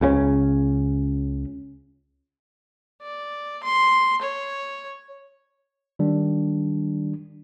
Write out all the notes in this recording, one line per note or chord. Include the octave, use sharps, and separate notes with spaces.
C#2 C#3 G#3 C#4
D5
C6
C#5
D#3 G3 D4